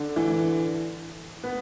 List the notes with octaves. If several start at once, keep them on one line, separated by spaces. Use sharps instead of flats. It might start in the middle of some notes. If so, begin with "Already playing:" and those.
Already playing: D3
E3
B3